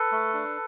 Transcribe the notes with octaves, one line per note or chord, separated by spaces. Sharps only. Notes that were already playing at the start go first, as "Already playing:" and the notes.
Already playing: A4 B4
A3
D4